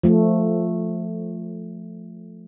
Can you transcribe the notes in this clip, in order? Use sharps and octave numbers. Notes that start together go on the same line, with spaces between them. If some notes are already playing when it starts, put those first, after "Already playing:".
F3 A3